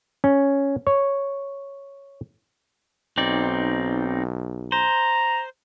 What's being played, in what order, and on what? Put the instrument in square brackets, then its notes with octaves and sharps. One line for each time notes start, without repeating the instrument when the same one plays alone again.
[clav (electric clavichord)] C#4
C#5
[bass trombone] B1 [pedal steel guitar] C4 D#4 D5
[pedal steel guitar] C5 [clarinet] A#5